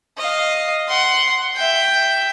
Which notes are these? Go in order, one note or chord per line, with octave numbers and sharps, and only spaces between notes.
D#5 F5
F#5 C6
E5 G5